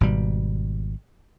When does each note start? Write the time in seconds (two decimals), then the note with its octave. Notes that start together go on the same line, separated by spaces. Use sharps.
0.01 G#1 B2 G3